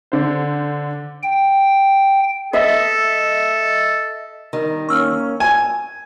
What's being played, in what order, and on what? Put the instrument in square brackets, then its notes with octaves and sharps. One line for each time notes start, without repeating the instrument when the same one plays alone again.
[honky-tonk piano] D3 C5
[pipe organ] G5
[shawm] A4 [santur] D#5 E5
[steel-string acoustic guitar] D#3 G3
[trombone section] A#3 C#4 [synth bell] C#6 E6 F6
[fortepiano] G#5